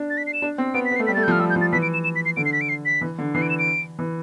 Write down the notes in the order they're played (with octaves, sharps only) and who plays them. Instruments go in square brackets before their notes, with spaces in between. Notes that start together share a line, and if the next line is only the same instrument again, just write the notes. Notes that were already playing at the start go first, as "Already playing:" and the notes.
Already playing: [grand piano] D4
[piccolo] A6
B6
C7
E7
[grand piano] D4
C4
[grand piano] B3 [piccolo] D7
[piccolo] B6
[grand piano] B3
[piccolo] C7
[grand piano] A3
[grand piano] G3 [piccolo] B6
[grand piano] A3 [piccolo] A6
[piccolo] G6
[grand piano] F3 [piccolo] F6
[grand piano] G3 [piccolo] E6
[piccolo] G6
[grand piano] F3
[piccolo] A6
[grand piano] E3 [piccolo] B6
[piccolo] D7
E7
E7
B6
C7
[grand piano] D3 [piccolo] D7
[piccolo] C7
B6
D7
C7
B6
[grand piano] E3
D3
[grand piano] E3 [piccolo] C7
[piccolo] D7
E7
D7
[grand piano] E3